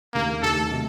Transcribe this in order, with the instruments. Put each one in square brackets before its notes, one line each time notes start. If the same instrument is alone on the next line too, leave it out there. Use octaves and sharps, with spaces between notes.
[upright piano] D#2 C#3 A3 [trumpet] A#3
[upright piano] D#2 C#3 A3 [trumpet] A4
[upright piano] C3 F#3 A3 D#4